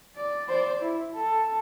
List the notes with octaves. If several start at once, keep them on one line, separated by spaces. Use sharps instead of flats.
D5
C5 D5
E4
A4